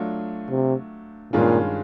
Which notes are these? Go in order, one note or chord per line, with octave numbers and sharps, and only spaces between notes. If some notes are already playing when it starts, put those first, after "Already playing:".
Already playing: F#3 A3 D4 F4
C3
G2 A#2 D#3 G#3 C#4 F4